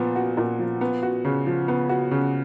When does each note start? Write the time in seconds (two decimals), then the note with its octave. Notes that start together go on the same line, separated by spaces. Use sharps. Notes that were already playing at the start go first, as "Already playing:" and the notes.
Already playing: A#2 F3 B3
0.16 F#4
0.37 A#2
0.59 F3
0.81 B3
1.03 F#4
1.25 C#3
1.46 F3
1.68 B3
1.89 F#4
2.11 C#3